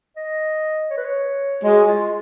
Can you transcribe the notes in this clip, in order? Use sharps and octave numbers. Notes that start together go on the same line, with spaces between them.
D#5
C#5
B4
C#5
G#3 F#4
F4